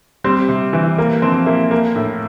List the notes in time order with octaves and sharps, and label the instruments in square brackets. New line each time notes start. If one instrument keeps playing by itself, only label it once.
[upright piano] G3 C4
C3
E3
A#3
F3 C4
A#3 E4
A#3
A2